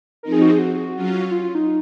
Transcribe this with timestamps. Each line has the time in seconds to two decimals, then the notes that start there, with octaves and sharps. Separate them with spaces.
0.23 F3 C4 D#4 A#4
0.32 G#4
0.42 F#4
0.51 G#4
0.59 F#4
0.95 F#3 C#4 F4
1.31 F4
1.43 F4
1.55 D#4